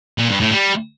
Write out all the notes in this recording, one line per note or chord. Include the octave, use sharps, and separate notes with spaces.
A#2
G2
A2
G3